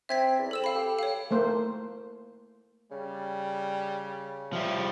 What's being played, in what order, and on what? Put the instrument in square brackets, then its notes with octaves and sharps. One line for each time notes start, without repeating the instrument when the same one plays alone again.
[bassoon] C4 [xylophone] E5 G#6 B6
[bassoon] E2
[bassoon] C4 [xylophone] A4 E6 E7
[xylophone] F5 B5
[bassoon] G4 [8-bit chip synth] A4 G5
[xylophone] C#5 F5
[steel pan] A3 A#3 C5
[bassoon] C#3 [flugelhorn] G3
[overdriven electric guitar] F3 G3 [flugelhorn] E5